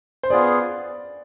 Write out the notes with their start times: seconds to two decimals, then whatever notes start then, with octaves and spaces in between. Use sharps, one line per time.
0.23 C5
0.30 B3 F4 G#4 D5